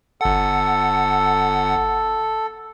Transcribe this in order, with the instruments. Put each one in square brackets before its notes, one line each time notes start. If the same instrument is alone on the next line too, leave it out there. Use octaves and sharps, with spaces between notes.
[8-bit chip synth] G1 F#5 [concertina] A4